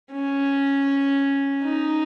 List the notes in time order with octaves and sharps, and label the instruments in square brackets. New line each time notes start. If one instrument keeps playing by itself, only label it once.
[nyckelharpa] C#4
D#4